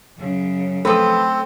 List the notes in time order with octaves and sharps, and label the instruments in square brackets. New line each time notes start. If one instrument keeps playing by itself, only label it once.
[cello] F#2 C#3
[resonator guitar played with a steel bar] F3 B4 [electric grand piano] A3 A4 [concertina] C4